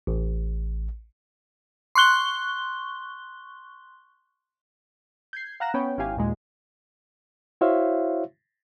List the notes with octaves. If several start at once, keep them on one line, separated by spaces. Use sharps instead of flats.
A1
C6 C#6 F#6 G7
G6 G#6 C7
F5 F#5 A#5 F#6 A#6 E7
B3 C#4 B4 C#5 G5
G#1 C#4 E4 G4 F5 G#5
D#2 A#2 G#3
E4 F#4 C5 C#5 E5 F5